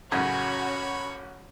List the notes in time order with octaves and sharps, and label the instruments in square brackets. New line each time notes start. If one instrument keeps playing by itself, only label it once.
[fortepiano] A1 F#2 C#3 [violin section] C#4 F#4 [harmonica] C#5 B5